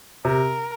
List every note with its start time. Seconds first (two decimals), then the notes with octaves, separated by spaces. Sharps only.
0.25 C3 A#4